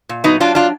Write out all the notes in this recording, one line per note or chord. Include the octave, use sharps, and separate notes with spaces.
A#2
F#3 B3 D#4
F#3 D4 F4
D4 F4